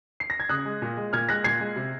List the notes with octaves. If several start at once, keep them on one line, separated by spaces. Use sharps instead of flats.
C7
A#6
G#6
C#3 D#6 F#6
G#3
A#2
G#3
A#2 F6 G#6
G#3 F#6 A#6
A#2 G#6 C7
G#3
C3